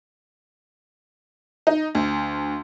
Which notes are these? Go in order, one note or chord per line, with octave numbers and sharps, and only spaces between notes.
D#4
D2